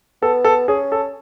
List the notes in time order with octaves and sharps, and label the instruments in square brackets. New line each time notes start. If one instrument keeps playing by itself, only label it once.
[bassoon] B3 [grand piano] A4
[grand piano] A4
[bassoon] C#4 [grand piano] G#4
[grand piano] A4